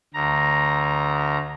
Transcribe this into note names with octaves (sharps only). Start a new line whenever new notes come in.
D2 A#5